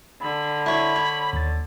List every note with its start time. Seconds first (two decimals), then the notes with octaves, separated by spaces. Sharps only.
0.21 D3 B5
0.66 E4 C#5 B5
0.96 C#5
1.33 D#2 A6